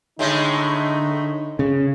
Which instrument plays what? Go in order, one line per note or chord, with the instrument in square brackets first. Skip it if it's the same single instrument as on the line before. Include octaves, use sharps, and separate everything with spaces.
[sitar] A2 G#3 A3 [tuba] D3 [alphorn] D#4
[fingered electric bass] C#3